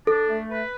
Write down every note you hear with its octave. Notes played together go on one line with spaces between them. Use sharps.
D4 A4
A3
B4